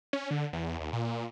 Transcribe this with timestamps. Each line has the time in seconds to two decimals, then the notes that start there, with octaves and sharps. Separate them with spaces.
0.13 C#4
0.31 D3
0.53 E2
0.80 D#2
0.93 A#2